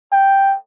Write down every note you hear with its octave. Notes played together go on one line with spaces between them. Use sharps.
G5